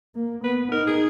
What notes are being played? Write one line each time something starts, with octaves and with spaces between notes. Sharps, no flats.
A#3
B3 B4
D#4 A#4
G#4